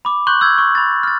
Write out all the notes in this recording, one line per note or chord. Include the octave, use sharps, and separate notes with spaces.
B5 D6
C6 C#6 F#6 G6 F#7
E6 G6 G#6
C#6
B5 A6
F6 A6